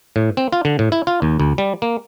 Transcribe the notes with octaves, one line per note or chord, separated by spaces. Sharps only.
A2
C4
F4
D3
A2
E4
F4
D#2
D2
G3
A#3